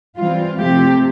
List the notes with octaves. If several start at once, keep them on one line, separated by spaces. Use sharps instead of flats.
E3 G3 C4 F4
C3 F3 A3 C4 G4